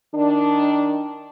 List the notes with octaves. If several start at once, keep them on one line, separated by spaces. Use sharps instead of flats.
D#3 D4